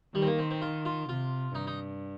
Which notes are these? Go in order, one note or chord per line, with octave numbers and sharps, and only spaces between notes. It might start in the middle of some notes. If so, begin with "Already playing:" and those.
D#3 G3
C4
A#3
C4
C4
F4
F4
C3 F4
G2 D#4
D#4